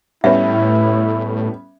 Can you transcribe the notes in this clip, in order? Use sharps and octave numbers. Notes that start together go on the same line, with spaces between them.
A2 G3 B3 C#4 E4 E5